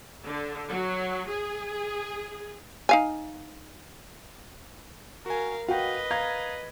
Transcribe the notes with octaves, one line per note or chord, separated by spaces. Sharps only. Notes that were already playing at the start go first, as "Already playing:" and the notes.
D3
F#3
G#4
D#4 F5 G#5
F#4 A#4 F5 G#5
F#4 B4 D#5 F5 G5
F5 A#5 G#6